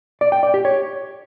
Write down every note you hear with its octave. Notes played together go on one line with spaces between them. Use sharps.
D5
G5
D5
G4
C#5